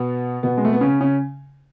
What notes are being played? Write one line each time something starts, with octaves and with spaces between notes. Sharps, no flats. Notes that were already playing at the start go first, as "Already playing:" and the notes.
Already playing: B2 B3
B2 B3
G#3
A3
B3
C#3 C#4
C#3 C#4